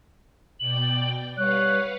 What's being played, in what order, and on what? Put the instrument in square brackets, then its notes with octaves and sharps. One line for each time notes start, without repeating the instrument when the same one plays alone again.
[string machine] B2 D5 G5 [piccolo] F#7
[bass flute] G3 [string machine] B4 F5 F#5 [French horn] C#5 [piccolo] F#6